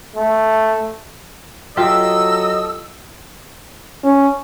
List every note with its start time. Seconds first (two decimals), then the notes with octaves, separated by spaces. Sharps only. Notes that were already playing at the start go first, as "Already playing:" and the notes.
0.16 A3
1.77 F#3 F4 G4 A4 D#5 E5 E6
4.04 C#4